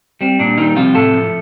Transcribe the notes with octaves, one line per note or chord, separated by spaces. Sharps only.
G3 C4
A#2 D4
D#3 G3 D#4
C3 F3 F4
A2 A3 A4
F3